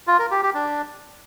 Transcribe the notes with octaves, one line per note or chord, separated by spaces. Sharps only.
F4
A#4
G4
G4
D4